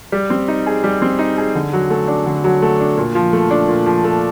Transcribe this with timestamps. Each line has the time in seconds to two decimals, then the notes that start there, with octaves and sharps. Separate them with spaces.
0.12 G3
0.30 C4
0.48 D#4
0.66 G#4
0.84 G3
1.02 C4
1.19 D#4
1.37 G#4
1.55 D3
1.73 F#3
1.90 A3
2.08 D4
2.26 D3
2.44 F#3
2.62 A3
2.80 D4
2.97 A#2
3.15 F3
3.33 A3
3.51 D4
3.68 A#2
3.86 F3
4.04 A3